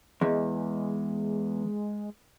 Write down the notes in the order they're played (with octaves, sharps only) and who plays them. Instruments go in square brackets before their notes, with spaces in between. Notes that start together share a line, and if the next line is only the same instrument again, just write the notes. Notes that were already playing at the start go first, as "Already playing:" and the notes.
[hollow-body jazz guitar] E2 [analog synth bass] G#3